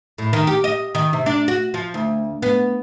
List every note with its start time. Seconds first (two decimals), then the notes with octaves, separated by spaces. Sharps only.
0.18 A2
0.33 D#3
0.47 G4
0.64 D#5
0.95 D#3
1.13 C3
1.26 D4
1.48 F#4
1.74 F3
1.94 D2
2.42 B3